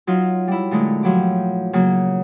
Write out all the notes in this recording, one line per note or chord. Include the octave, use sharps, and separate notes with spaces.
F#3 D#4 F4
G3 E4
A#2 D3 G#3 A3
F3 F#3 E4 G4
C#3 F#3 A#3